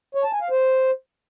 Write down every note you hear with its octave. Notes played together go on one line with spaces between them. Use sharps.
C#5
A5
G#5
F5
C5